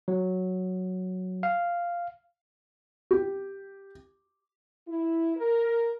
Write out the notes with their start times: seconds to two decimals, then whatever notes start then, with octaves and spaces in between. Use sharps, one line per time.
0.08 F#3
1.43 F5
3.11 G4
4.88 E4
5.37 A#4